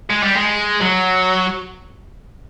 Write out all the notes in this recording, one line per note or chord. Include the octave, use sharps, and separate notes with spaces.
G#3
G3
G#3
F#3